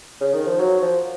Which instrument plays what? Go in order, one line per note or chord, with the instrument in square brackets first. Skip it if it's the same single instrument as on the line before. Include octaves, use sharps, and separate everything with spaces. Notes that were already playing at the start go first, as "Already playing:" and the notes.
[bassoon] C#3
D#3
F3
F#3
F3